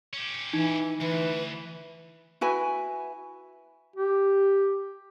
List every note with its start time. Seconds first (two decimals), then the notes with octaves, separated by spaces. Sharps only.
0.13 C#4 G4
0.53 E3 D#4
1.01 D2 E3 B4
2.41 E4 F#4 B4 G#5
3.96 G4